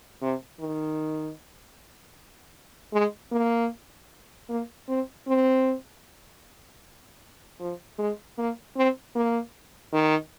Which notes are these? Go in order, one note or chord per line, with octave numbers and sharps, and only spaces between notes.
C3
D#3
G#3
A#3
A#3
C4
C4
F3
G#3
A#3
C4
A#3
D#3